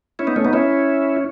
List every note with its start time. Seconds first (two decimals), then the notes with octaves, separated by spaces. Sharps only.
0.19 C#4 E4
0.27 B3 D#4
0.36 A3 C#4
0.45 B3 D#4
0.53 C#4 E4